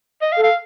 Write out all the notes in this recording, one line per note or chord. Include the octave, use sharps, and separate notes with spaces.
D#5
F5
A4
F5